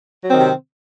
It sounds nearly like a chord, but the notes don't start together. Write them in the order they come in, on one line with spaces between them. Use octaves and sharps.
F#3 C4 D#3 C3